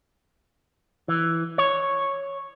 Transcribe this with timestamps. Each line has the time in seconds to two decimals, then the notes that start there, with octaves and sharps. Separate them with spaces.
1.08 E3
1.58 C#5